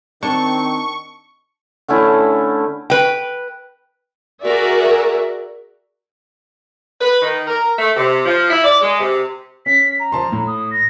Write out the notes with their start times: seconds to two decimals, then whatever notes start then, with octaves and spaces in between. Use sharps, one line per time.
0.23 D#3 C4 D4 C#6
1.88 D3 A3 C#4 E4
2.90 B4 G5
4.42 F#4 G#4 A#4 D5 E5
7.01 B4
7.22 D#3
7.46 A#4
7.79 A3
7.96 C3
8.25 F3
8.50 E4
8.64 D5
8.81 G#3
9.00 C3
9.66 C#4 B6
10.00 A#5
10.12 F3 A5 C6
10.32 A2
10.47 D#6
10.71 A#6